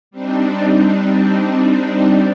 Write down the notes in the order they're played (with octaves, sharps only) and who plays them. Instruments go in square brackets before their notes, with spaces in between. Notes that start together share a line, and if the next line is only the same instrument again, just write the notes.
[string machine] G3 C4 D4 D#4